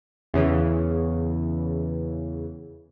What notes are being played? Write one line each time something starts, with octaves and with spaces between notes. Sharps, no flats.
E2 C#3 E3